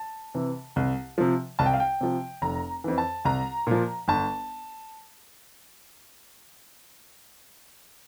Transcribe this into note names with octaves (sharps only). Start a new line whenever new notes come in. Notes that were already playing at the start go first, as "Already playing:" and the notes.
Already playing: A5
C3 E3
C2
C3 F3
C2 A5
G5
F5
G5
C3 F3
F1 A#5
F2 E3
A5
C2 A#5
A#2 F3
G1 A5